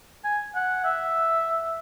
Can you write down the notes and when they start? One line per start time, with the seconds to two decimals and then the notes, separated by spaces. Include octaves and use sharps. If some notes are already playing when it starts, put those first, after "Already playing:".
0.24 G#5
0.55 F#5
0.85 E5